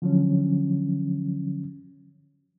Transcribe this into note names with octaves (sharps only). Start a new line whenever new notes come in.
D3 F3 F#3 C#4